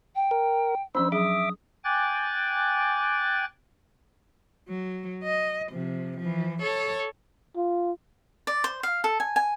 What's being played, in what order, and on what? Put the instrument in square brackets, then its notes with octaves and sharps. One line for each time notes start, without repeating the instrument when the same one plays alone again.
[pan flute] G5
[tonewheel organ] A#4
[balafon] F3 C#4 D4 [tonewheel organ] C5 [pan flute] E6
[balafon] F#3 G#4 [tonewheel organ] E5 D6 [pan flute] D#6
[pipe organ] G5 G#5 D6 F#6 A6
[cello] F#3
D#5
C3 F3
E3 F3
A4 C#5
[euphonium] F4
[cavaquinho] D5
C5
F5
A4
G#5
G#5